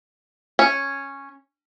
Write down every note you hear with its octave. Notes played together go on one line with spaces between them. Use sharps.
C#4